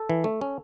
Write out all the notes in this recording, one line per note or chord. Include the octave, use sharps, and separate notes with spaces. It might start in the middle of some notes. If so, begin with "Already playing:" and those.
Already playing: A4
E3
A3
C#4